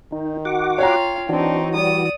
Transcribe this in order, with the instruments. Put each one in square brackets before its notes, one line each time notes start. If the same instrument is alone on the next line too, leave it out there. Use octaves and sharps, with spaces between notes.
[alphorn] D#3 [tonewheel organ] D#4
[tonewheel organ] F#4 F#5 D6
[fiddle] F4 F5 [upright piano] C#5 G5 A#5
[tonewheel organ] E3 F#4 [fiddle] C4 D#4 [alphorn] D4
[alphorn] G3 [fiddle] D5 D#6